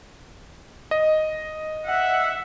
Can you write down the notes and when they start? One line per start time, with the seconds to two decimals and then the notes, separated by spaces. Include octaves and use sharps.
0.91 D#5
1.86 E5 F#5